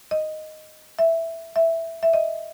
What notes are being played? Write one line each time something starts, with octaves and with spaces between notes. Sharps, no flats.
D#5
E5
E5
E5
D#5